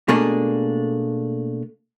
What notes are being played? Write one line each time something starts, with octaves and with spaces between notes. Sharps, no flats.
B2 A3 A#3 D4 G#4